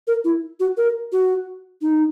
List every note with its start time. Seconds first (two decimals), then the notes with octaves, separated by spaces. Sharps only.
0.07 A#4
0.24 E4
0.60 F#4
0.77 A#4
1.12 F#4
1.82 D#4